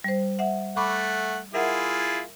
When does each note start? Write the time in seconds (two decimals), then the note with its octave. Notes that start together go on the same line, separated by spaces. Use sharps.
0.04 G3 C5
0.39 E5 F#5
0.77 A3 F#5 B5 C#6 D6
1.54 E4 F4 G#4 A#4 E5 F#5